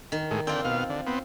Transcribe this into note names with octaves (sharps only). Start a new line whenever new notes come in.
D#3
A2 G#3
D3 C4 F4 G5
B2 F5
D3
B3 C4